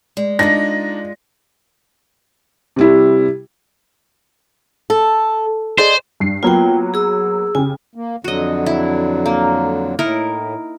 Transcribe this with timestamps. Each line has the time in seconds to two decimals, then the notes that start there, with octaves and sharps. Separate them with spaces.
0.17 G#3 D5
0.39 G#3 D4 D#4 F4 A#6
2.76 C3 G3 E4
4.90 A4
5.78 G#4 C5 D5 D#5
6.20 G2 C7
6.43 F#3 A#3 B3 F4 G5
6.94 G#4 E6
7.55 C#3 G4 G#5
7.95 A#3
8.24 F2 D3 F#3 F#4 D#5
8.66 E4
9.26 A#3
9.99 A2 D#4 E4 A#4